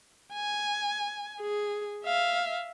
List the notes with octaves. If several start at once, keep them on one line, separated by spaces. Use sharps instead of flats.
G#5
G#4
E5 F5